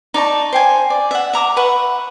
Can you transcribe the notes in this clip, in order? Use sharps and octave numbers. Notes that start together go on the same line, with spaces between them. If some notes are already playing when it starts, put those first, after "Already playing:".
D#4 D5 A5 C#6
C5 G5 G#5
D5
E5 F#5
E5 A#5 D6
B4 E5 F#5 C#6